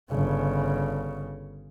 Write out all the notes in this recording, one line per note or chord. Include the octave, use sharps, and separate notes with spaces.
G1 C#3